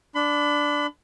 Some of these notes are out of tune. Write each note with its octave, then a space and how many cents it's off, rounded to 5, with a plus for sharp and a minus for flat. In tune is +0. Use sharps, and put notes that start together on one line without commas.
D4 +0 B5 +30